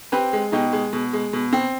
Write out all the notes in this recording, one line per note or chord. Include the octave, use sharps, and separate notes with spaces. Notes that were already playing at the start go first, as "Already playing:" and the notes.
C4 G4 B4
G#3
B2 D#4 G4
G#3
B2
G#3
B2
C4